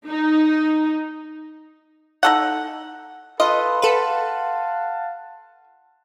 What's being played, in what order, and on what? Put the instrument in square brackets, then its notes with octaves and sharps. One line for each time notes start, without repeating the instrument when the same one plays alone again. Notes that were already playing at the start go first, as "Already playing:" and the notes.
[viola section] D#4
[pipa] D#4 A4 F#5
[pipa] F4 [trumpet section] A4 B4 [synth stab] D#5
[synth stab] A4 B4 [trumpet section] F5 F#5 A5